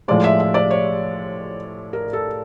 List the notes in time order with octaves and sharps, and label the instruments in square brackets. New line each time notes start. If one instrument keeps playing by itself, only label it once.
[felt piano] A2 F3 G#3 D5
E5
E5
D5
C#5
A#4
A4